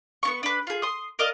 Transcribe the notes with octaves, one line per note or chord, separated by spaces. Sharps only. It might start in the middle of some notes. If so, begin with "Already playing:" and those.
B3 C#4 C#6
D4 B4
F4 G#4
C6 D#6
A#4 D5 D#5 F5